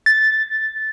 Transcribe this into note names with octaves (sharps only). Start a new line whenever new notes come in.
A6